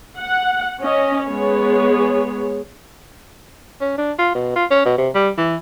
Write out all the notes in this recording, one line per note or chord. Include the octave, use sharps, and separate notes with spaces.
F#5
C#4 D#5
G#3 B3 G#4 C#5
C#4
D4
F4
B2
F4
C#4
B2
C3
G3
E3